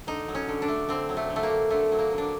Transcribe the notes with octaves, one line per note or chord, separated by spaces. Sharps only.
D3 D#4
F#3
C#4
D3
D4
A3
D3 C4
F#3
A3
D3
A3
A#3
A3
D3 A3
F#3
A#3
D3
D4